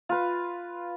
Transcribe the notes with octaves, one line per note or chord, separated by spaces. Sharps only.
F4 B4